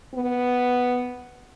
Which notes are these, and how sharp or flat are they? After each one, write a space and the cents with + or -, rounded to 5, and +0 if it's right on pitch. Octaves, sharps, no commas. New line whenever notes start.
B3 +0